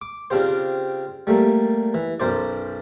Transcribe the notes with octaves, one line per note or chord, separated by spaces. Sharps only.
D6
C#3 C4 D4 F4 G4 C5
G3 A3 A#3
E3
B1 F#2 C5 D5